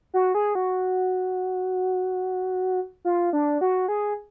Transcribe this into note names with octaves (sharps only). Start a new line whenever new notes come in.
F#4
G#4
F#4
F4
D4
F#4
G#4